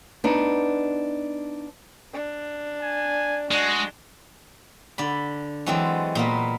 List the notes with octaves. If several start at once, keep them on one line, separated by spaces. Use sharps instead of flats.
B3 D4 D#4
D4
G#5
G#3 D4 F#4
D3 D5 B5
E3 F#3 G#3 C4 A4 D5
A#2 A#3 B3